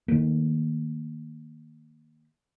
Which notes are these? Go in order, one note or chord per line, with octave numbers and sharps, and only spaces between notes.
D#3 F3 A3 A#3